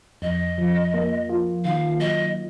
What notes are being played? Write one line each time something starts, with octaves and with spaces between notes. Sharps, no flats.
F2 D#5
F3
A#3
F4
D#3 F5
F#3 D#5